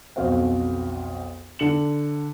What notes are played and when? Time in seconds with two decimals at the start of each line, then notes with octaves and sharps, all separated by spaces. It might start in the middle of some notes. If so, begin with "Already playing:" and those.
0.16 B1 F2 F#4 C5 F5
1.59 D3 C#7 F#7